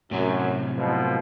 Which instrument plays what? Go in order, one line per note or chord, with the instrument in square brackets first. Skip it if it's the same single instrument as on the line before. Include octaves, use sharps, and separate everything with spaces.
[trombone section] F#2 [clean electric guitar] A2 C3 F#3
[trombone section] C2 B2 F3